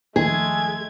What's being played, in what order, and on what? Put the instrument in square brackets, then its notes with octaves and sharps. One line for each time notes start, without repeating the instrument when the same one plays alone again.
[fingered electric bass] D#2 D#3 F3 [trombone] G#3 [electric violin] A3 G#6 [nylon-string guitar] G#4